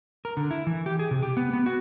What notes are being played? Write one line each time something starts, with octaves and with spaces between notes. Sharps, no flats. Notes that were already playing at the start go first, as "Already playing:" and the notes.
A#4
D3
E4
E3
G4
G#4
C3
G4
B3
B3
F#4